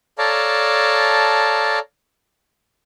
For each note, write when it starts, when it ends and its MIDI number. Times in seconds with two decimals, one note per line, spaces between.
0.18 1.79 69
0.18 1.79 73
0.18 1.79 74
0.18 1.79 77
0.18 1.79 81
0.18 1.79 82